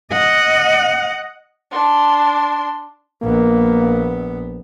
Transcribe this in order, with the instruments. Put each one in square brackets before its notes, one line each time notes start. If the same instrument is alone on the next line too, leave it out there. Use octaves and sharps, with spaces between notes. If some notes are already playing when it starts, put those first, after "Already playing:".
[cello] D#5 F#5
[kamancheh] D4 C6
[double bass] A#1 B3 [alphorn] A#3